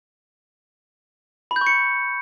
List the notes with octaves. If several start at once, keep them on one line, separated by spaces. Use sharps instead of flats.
B5
G6
C#6
C#7